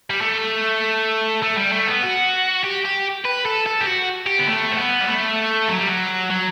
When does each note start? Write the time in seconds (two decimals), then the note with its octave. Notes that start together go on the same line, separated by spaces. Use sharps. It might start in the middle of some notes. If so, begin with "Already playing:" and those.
0.10 G3
0.21 A3
1.42 A3
1.57 G3
1.72 A3
1.87 B3
2.03 F#4
2.63 G4
2.85 G4
3.25 B4
3.45 A4
3.66 A4
3.80 G4
3.86 F#4
4.26 G4
4.39 B3
4.47 A3
4.72 C4
4.77 B3
5.01 G3
5.07 A3
5.68 F#3
5.78 G3
5.88 F#3
6.30 F#3